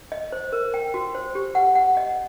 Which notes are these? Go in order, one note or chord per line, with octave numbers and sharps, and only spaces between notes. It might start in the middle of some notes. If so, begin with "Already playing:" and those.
D#5
C5
A#4
G5
F#4
C5
G4
F#5
F#5
D#5